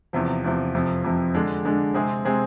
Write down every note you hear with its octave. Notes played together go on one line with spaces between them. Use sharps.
E2 C3 F3
E2 C3 F3
F2 C3 F3
F2 C3 F3
D3 G#3 D4
D3 G#3 D4
C3 G#3 C4 G#4
C3 G#3 C4 G#4